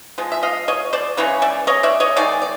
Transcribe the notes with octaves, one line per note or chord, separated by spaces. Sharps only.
F3 G#3
E5
D#5 F5
C#5 D#5
C5 D5
C#3 E3 G#3 C#5
D5 E5
C#5 D#5
D5 E5
C#5 D#5
D#3 G#3 D5
D5